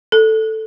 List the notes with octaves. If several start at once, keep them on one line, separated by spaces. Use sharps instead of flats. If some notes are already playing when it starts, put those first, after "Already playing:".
A4